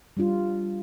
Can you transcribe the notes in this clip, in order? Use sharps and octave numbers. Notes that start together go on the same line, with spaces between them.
G3 D4 F4